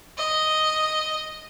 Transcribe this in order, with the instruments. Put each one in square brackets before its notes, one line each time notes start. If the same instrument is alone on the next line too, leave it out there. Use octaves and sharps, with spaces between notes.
[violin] D#5